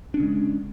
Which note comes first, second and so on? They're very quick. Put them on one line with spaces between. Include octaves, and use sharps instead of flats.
D4 C#4 C#3 G#3